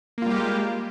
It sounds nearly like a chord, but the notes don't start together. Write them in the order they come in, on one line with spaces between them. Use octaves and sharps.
A#3 F4 G3 G4 G#3